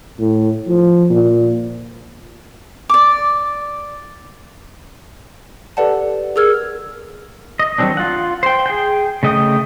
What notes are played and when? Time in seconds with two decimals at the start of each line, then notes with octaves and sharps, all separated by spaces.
0.20 A2
0.68 F3
1.10 A#2
2.89 D5 D6
5.77 G4 A4 B4 D5 F#5 A5
6.36 G#4 A#4 E6 F6 G#6
7.59 D#5
7.78 D#3 F#3 G3 C4 D4
7.97 F4 F#5
8.43 C5 G5
8.66 G#4 G5
9.23 C#3 A3 D#5 G5 D#6